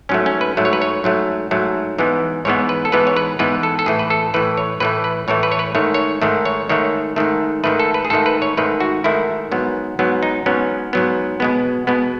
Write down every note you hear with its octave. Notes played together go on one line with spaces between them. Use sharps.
G#2 F#3 A3 C#4
C#4
B4
G#2 F#3 A3
C#5
B4
C#5
G#2 F#3 A3
G#2 F#3 A3
G#2 E3 G#3 B3
G#2 E3 G#3 B3 C#5
B4
A4
G#2 E3 G#3 B3 B4
C#5
B4
G#2 E3 G#3 B3 B4
A4
A4
A2 E3 A3 G#4
B4
A4
A2 E3 A3 B4
C#5
A2 E3 A3 B4
B4
A2 E3 A3 C#5
B4
C#5
B4
G#2 D#3 A3 C#5
C#5
G#2 D#3 A3
C#5
G#2 D#3 A3 C#5
G#2 D#3 A3
G#2 D#3 A3 B4
A4
B4
G#4
G#2 D#3 A3 A4
B4
C#5
G#2 D#3 A3 B4
F#4
G#2 D#3 A3 E4
G#2 F#3 B3
G#2 F#3 B3
D#4
G#2 F#3 B3 C#4
G#2 F#3 B3
B2 G#3 B3
B2 G#3 B3